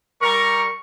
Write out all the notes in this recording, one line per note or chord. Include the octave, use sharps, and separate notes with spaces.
G3 A#4 C#6